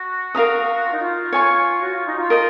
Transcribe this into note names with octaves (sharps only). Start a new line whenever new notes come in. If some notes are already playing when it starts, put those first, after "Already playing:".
Already playing: F#4
A#4 F5 A#5 D#6
F4
D#4
F4
C#5 G#5 C#6
F#4
F4
D#4
F4
A#4 D#5 A#5